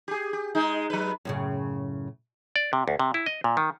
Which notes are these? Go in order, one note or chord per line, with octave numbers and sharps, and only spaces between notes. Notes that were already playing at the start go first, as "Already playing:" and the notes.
G4 G#4
G4
G#3 D#4
F#3 B4
F#2 A2 C#3
D5
C3
D2
C3
E4
D#5
A#2
D#3